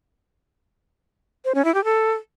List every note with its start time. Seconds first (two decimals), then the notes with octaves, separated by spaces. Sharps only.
1.45 C5
1.55 C#4
1.65 E4
1.74 G4
1.84 A4